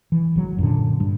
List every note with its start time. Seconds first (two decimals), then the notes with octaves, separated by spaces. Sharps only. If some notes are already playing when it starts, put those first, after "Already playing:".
0.12 E3
0.36 G#1 F#3
0.58 F#2 A#2 D3
1.00 G2